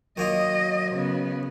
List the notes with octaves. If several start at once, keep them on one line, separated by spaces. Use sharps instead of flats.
D#3 F#3 A#3 F4 D#5
C#3 B3